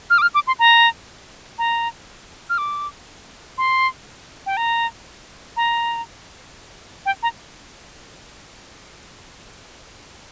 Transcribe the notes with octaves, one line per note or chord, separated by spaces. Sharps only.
F6
D6
F6
D6
C6
A#5
A#5
F6
D6
C6
G5
A#5
A#5
G5
A#5